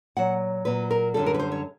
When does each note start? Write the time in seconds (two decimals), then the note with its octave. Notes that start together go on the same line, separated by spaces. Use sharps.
0.17 A#2 F#3 F#5
0.65 A#2 F#3 B4
0.91 A#4
1.14 F#2 D3 G3 A4
1.26 A#4
1.34 B4
1.39 C5
1.52 C#5